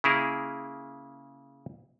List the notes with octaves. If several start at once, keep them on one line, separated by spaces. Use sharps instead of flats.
C#3 A#3 E4 G#4 A#4